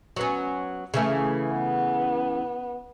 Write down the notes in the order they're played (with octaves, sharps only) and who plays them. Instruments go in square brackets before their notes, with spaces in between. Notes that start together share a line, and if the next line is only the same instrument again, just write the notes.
[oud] F#3 B3 C#4
C#3 E3 A3
[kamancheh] B3